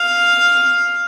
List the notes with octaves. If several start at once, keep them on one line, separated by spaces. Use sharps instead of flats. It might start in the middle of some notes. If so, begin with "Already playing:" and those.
Already playing: F5